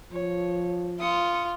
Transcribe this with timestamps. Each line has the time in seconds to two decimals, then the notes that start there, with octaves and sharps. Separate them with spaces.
0.12 F3 C#5
1.00 F4 D#6 C#7